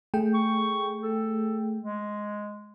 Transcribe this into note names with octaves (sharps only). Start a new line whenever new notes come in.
A3 G#4 G5
C#6
A4
G#3